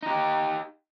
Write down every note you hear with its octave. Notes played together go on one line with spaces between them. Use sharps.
D#4 G4